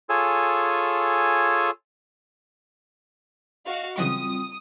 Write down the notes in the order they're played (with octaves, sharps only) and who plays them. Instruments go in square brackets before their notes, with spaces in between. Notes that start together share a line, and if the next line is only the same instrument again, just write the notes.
[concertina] F4 G#4 A4 C#5 G#5 E6
[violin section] F#4 F5 [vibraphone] D#5
[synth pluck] C#3 E3 F#3 [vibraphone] G3 C4 F4 [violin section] D#6